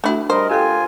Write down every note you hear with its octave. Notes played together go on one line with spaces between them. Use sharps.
D3 A3 D4 E4 F#4
G3 A#4 C5 D#5
F4 G4 A4 G5 G#5